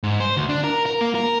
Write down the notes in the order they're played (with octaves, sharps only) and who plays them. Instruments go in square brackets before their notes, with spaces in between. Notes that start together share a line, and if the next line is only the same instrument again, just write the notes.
[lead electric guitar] G#2
C5
D2
D4
A#4
A#4
A#3
A#4